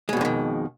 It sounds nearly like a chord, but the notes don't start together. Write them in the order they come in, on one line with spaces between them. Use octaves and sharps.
G#3 B2 F2 D3 D#3